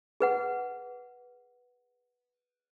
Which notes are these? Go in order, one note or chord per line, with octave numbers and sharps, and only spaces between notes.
G#4 B4 F#5